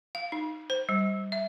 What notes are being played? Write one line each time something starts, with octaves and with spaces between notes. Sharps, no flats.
F5
D#4
C5
G3
E5